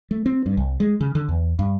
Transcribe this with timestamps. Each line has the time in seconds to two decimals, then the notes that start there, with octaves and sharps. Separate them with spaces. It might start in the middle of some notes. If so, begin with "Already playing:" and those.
0.11 A3
0.26 C4
0.46 G2
0.57 C2
0.80 G#3
1.01 C#3
1.15 D3
1.28 E2
1.59 G2